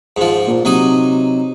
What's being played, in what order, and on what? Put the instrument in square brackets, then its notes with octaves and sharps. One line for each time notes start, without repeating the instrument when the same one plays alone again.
[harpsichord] G#2 F3
[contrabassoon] A#2
[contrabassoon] C3 [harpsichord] F#3 D#4 D#6